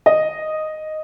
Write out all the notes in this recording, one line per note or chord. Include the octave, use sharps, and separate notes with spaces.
D#5